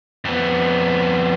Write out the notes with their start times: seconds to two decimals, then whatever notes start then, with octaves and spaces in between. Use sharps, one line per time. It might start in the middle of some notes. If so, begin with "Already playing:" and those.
0.25 F2 B3